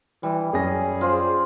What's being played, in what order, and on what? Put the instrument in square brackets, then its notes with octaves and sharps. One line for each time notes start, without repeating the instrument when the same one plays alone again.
[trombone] E3 [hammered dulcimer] G3
[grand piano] F#2 C#4 A#6 [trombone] G#4
[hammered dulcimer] F4 C5 D5